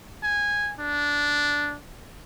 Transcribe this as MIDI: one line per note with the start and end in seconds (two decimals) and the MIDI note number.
0.24 0.73 80
0.79 1.77 62